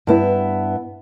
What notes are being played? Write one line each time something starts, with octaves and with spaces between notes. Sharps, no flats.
G2 B3 E4